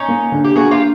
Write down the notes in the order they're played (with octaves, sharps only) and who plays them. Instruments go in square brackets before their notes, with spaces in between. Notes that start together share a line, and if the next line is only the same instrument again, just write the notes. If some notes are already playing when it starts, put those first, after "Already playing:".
Already playing: [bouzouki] C#4 D#4
[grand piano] A#3
D3
[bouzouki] G4
[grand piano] A#3 [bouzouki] F#4 G#4
[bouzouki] F4 G4